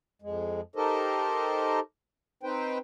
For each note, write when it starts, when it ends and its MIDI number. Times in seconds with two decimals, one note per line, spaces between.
0.22 0.61 41
0.22 0.61 56
0.76 1.80 63
0.76 1.80 67
0.76 1.80 69
0.76 1.80 70
0.76 1.80 72
0.76 1.80 75
2.43 2.78 60
2.43 2.78 63
2.43 2.78 71
2.43 2.78 72
2.43 2.78 79